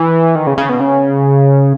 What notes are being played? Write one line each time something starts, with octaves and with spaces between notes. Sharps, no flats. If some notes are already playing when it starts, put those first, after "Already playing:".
Already playing: E3
D#3
C#3
C#3
B2
C#3